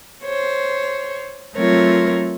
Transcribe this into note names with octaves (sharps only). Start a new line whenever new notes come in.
C5 C#5
F#3 A3 C4 F4 A#4 C#5